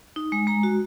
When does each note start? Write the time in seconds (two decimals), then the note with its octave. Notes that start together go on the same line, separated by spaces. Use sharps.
0.16 D#4
0.32 G#3
0.47 G#3 A#5
0.63 F#4